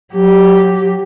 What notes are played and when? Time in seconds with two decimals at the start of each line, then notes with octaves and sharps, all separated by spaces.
0.14 F#3 G4